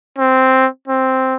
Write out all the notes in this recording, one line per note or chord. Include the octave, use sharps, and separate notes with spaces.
C4
C4